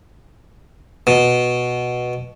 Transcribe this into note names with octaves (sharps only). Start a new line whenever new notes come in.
B2